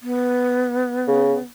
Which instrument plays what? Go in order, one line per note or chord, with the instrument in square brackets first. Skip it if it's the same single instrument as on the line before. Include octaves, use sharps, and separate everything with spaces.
[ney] B3
[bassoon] C#3